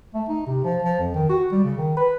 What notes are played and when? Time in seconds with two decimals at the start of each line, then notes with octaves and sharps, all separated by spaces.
0.14 A3
0.29 D#4
0.46 C3
0.64 F3
0.82 F3
0.99 F2
1.15 D#3
1.29 F#4
1.52 G3
1.64 C#3
1.78 D#3
1.97 B4